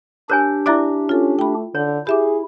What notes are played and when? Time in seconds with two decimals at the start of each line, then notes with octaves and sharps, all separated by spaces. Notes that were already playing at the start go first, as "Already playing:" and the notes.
0.30 D4 G4 A#4 C#5 G#5 F#6
0.66 E4 D5 E5 D6 F#6 A6
1.09 C#4 F4 A4
1.39 A3 G5 B5
1.75 D3 C#5
2.07 E4 G4 G#4 E5 D6